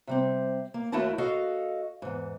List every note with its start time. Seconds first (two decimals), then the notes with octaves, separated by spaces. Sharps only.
0.07 C3 G3 C4
0.74 A#3
0.92 D#2 A3 E4 F#4 A#4 A5
1.18 F#4 A4 D#5 F5
2.02 E2 G#2